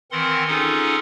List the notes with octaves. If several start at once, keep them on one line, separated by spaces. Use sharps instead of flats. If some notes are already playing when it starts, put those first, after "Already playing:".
D#3 E3 C4 A#4 F#5 C6
C#4 D#4 F4 G#4 A4 F#5